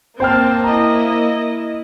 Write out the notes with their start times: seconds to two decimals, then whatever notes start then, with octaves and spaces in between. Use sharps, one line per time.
0.20 A#3 C4 C5 G5 A5 F6
0.64 E4 D#5 A#5